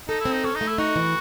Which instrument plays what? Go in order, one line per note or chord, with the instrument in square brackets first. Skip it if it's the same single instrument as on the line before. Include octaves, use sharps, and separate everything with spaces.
[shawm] D#4 [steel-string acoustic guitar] A4
[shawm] E4
[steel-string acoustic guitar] C4
[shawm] D#4
[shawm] C#4 [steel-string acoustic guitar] A4
[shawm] D#4
[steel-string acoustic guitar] A3
[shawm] E4
[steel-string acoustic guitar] D#4 [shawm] F#4
[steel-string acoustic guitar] E3